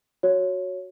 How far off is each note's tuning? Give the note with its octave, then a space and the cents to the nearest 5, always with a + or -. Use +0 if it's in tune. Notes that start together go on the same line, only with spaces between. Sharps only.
F#4 -5 C#5 +0